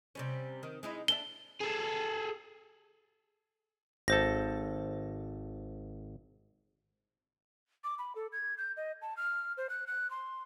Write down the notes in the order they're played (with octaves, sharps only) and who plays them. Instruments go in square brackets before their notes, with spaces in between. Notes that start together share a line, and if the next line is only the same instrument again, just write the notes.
[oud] C3 G3 C#4
D#3
G#3 D#4 E4
[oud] D4 A4 E5 [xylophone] G7
[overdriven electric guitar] G#4 A4
[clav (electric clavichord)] G#1 A4 [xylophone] C5 A#6
[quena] D6
B5
A4
G#6
G6
D#5
A5
F6
C5
F#6
F#6
C6